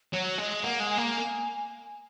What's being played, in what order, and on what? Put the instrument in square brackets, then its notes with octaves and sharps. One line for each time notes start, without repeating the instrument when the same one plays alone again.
[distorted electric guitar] F#3 [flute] C#5
[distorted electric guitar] G#3 [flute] D#5
[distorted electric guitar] A#3 [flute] F#5
[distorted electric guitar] G#3
[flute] G#5
[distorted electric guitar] A#3